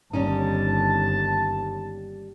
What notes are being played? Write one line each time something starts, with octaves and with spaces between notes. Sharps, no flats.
G1 D#2 G3 C#4 D#4 A5